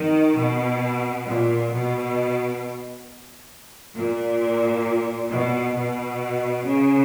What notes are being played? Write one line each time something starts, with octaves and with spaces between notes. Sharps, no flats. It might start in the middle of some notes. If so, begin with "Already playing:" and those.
Already playing: D#3
B2
A#2
B2
A#2
B2
B2
C#3